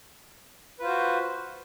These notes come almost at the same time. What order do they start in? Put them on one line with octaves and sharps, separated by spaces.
B4 F4 C5 F#4